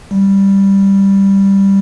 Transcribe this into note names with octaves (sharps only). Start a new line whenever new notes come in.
G3